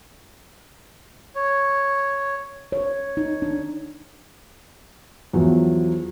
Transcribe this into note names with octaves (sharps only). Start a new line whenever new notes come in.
C#5
C#5
D#4
D4
E2 F3 F#3